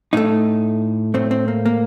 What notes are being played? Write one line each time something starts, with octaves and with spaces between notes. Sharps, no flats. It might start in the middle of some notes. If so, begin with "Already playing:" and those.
A2 A3 D#4
A2 A3 C4
C4
A#3
A#3